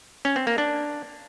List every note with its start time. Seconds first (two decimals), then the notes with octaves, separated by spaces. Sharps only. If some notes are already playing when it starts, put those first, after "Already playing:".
0.25 C#4
0.36 C4
0.47 A#3
0.58 D4